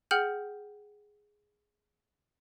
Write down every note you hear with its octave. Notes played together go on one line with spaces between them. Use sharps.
G#4 F#5 G5 F6 G6 F#7